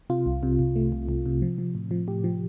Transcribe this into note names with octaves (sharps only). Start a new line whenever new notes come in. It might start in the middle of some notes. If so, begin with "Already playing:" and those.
C3 F4
C2
C3
C2
A3
C2
C2
C3
F3
F3
A2
F3
A2 G4
F3